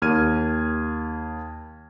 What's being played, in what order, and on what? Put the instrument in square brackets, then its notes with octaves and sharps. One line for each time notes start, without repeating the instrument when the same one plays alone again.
[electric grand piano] D#2 F6 G#6 D#7